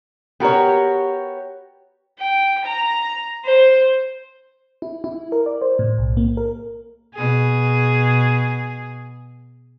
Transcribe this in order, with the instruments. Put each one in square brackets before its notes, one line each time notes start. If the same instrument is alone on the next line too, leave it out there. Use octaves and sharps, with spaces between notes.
[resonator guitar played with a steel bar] B3 F#4 A#4 [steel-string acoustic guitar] G4 C#5
[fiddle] G5
A#5
C5
[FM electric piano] E4
E4
A#4
D5
C5
A2
B1
A#3
A#4
[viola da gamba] B2 G#4